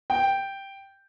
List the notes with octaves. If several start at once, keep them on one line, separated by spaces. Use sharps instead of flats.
G5